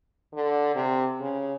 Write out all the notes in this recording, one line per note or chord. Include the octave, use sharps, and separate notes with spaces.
D3
C3
C#3